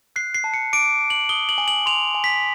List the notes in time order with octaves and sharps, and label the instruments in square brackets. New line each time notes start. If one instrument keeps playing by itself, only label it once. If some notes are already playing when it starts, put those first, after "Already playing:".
[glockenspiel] F#6 C7
C7
A5
C#7
D6 D7
A5
F#7
D#6 G7
F#7
G#5
F#7
C6 F7
G#5
B6